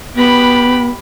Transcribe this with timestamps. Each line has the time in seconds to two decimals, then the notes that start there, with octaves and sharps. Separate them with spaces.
0.16 B3 G4 B5